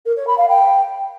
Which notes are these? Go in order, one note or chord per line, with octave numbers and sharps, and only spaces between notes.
A#4
C#5
B5
F5
G5